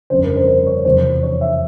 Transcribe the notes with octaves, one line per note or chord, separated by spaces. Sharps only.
G1 F2 C#3 C5
A#4
C5
C5
C#5
E2 C3 F3 C5
C#5
E5